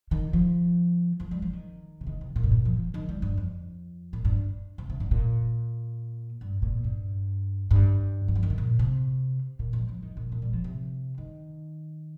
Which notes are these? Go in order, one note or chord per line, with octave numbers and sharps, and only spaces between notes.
D#3
F3
F3
G3
F3
D#3
C3
D#3
C3
A#2
G2
A#2
F3
F3
D#3
G3
G2
F2
A#2
G2
C3
C3
G2
A#2
G2
A#2
G2
G2
G3
F3
D#3
C3
A#2
C3
A#2
F2
F3
D#3
A#2
A#2
G3
F3
C3
D#3